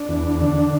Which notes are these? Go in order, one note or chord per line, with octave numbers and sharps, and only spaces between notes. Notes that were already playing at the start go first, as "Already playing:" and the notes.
Already playing: D4
E2
D3